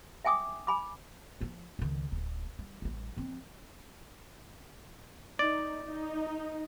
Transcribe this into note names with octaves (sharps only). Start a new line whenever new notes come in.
E5 G5 G#5 D6 D#6
G#5 B5 D6
F3 E4
C#2 D#3
D1
G3
A1 G3
F3 C4
D#4 D5
D#4